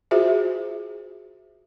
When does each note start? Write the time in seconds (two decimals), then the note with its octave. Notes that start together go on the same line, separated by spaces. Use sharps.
0.11 F4 F#4 G#4 C5 E5